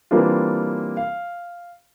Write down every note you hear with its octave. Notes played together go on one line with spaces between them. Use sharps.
E3 G3 A#3 C4 D4 F4
F5